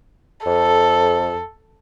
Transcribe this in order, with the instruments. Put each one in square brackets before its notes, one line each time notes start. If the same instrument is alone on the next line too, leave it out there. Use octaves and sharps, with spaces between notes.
[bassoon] F2 [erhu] A4